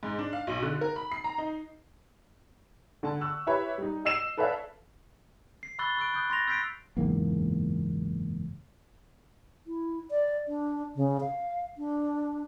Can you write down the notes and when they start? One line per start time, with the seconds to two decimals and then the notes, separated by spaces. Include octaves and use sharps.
0.03 G#2
0.19 D4
0.33 F5
0.47 B1
0.62 D3
0.81 A#4
0.96 B5
1.12 C7
1.24 A#5
1.38 D#4
3.03 D3 A5
3.21 C#6 E6 F#6
3.47 E4 G4 B4 C#5 E5 B5
3.78 G3 D#4
4.05 D#5 E6 C7 E7
4.37 A4 B4 C#5 D5 E5 F5
5.63 C7
5.79 B5 C#6 E6 F#6 A6 G7
5.97 C#6 E6 F#6 D7
6.14 D#6 E6 F#6 G6
6.30 C6 A6 A#6 F7
6.47 E6 G6 A6 B6 C7 D7
6.97 F#1 E2 G#2 A#3
9.67 E4
10.11 D5
10.48 D4
10.96 C#3
11.21 F5
11.78 D4